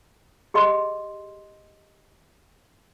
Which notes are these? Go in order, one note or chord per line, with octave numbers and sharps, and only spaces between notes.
G4 G#4 D#5 C6